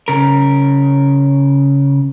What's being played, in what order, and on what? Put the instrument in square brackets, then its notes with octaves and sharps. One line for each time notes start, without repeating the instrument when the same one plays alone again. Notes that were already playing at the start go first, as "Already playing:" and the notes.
[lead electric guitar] C#3 A#4